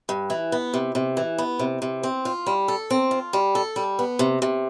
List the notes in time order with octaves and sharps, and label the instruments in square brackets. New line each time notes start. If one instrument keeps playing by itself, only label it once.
[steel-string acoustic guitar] G2
E3
B3
C3
C3
E3
B3
C3
C3
C4
F4
G3
A4
C4
F4
G3
A4
G3
B3
C3
C3